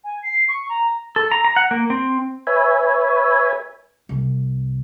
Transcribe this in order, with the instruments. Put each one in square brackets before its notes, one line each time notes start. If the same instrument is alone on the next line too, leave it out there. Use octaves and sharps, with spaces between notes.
[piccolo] G#5
C7
C#6
A#5
[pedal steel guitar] A4
A#5
A#5
F#5
A#3
C4
[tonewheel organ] B4 C#5 E5 G#5
[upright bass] C2 C3